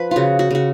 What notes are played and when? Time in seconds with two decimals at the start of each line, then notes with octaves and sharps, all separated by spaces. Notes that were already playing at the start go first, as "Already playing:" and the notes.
Already playing: F3 B4
0.11 C#3 F4 F#4
0.39 F#4
0.51 C#3 F#4